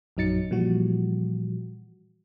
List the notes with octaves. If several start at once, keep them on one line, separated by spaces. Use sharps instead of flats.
A#1 F#2 F#3 D#4 A6 C#7
A#2 E3 F3 G3 F#4